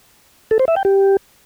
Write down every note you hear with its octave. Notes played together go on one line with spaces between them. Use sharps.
A4
C5
E5
G5
G4